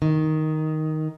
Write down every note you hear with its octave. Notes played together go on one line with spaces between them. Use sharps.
D#3